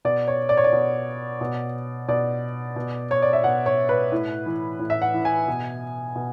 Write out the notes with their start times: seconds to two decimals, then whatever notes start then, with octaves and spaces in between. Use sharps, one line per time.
0.05 B2 D5
0.28 C#5
0.49 D5
0.57 C#5
0.64 D5
0.72 B2
1.41 B2
2.08 B2 D5
2.76 B2
3.11 C#5
3.22 D5
3.33 E5
3.44 B2 F#5
3.66 C#5
3.89 B4
4.12 A2
4.46 E3
4.79 A2
4.90 E5
5.02 F#5
5.14 E3
5.25 G#5
5.48 B2
6.15 B2